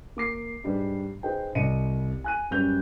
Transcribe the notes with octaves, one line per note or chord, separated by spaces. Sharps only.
A#3 D6 C7
G#2 G3 D4 B4
D#4 G#4 B4 C5 G5
C2 D#5 C#7 D#7
G#5 F#6 D#7
F#2 G3 C#4 B4 G6 F7